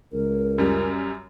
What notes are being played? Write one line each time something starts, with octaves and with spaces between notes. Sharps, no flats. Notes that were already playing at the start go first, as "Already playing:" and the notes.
C#2 A#4
F#2 G3